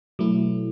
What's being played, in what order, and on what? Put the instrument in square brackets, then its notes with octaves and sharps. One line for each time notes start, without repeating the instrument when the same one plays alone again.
[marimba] B2 [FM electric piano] F#3 A3 E4